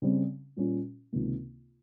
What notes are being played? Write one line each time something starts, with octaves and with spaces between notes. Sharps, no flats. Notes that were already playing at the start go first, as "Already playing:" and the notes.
C#3 G3 C4
A#2 G3 C#4 F4
C#2 C3 D#3 A#3